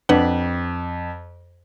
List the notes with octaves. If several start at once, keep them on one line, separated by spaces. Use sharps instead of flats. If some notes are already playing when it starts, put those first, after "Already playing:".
F2 D4 B4 F#5